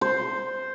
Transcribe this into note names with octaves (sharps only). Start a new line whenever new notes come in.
C5